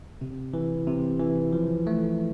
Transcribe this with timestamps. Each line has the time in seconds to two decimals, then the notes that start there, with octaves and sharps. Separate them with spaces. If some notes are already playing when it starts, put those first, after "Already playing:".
0.21 C3
0.54 E3
0.87 C3
1.20 E3
1.52 F3
1.87 A3